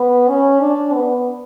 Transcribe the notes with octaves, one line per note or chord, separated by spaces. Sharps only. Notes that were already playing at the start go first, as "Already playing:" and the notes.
Already playing: B3
C#4
D4
B3